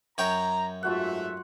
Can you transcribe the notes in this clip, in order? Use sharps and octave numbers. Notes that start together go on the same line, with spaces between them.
F#2 C#5 G5 A#5
G#2 A3 F4 F#4 E5 F#5